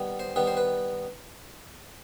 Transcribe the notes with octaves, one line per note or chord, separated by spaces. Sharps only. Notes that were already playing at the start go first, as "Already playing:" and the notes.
Already playing: D#3 G3 B3
C5
D#3 G3 B3 B4
C5
B4